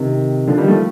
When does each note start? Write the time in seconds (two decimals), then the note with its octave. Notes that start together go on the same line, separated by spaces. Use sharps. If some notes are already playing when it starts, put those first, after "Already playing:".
Already playing: C3 D#3
0.47 D3 F3
0.58 D#3 G3
0.68 F3 A3